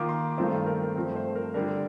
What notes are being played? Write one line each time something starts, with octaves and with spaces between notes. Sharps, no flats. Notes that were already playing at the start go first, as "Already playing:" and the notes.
Already playing: D#3 A#3 F4 D6
C6
G2 D#3 A3 C4 F4 C5
A4
A#4
A#4
G2 F3 A3 C4
C5
A#4
D3 G3 D4 A#4